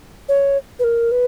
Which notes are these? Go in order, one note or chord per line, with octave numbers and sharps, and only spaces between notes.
C#5
B4
A#4
B4